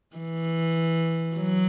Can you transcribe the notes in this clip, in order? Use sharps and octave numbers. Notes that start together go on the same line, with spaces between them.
E3
F#3